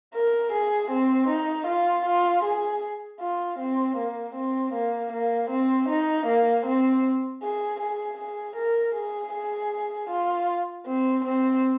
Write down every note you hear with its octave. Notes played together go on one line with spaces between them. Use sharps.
A#4
G#4
C4
D#4
F4
F4
G#4
F4
C4
A#3
C4
A#3
A#3
C4
D#4
A#3
C4
G#4
G#4
G#4
A#4
G#4
G#4
F4
C4
C4